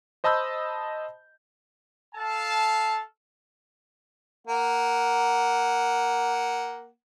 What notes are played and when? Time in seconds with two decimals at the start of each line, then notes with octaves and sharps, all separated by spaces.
0.24 C5 D#5 A5 B5 E6 G6
2.15 A4 F5 A5
4.47 A#3 F#5